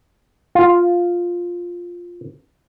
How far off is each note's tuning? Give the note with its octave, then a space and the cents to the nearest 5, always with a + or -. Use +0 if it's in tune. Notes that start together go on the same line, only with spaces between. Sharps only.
F4 +5